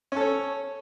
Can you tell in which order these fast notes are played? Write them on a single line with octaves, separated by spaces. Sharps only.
C#4 A4 C#5